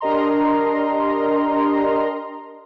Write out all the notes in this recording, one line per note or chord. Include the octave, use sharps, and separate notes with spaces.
D4 G4 A#4 D#5 A#5 C6